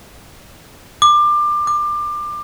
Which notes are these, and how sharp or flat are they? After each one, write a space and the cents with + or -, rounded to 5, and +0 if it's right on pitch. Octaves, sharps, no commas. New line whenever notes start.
D6 +25
D6 +25